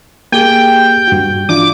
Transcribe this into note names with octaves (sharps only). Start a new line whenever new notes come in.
A#3 G4 G#4 G5
G2 F#4
E3 D4 F4 D6